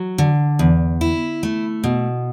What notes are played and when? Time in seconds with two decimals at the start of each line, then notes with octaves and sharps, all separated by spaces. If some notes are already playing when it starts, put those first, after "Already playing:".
Already playing: F#3
0.18 D3
0.59 E2
1.01 E4
1.43 A3
1.84 B2